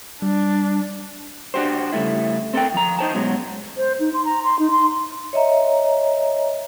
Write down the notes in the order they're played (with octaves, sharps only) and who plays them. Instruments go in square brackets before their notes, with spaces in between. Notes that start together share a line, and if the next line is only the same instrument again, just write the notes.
[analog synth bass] G3 [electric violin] D4
[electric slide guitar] D4 F#4 G4 C5
C#3 G3 A3 E4
C4 A4 A#4 G5
F3 A#5
D#4 C5 A5
F#2 B2 F#3 G#3
[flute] C5
D#4
C6
A#5
C6
D#4
C6
[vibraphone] C#5 D#5 E5 A#5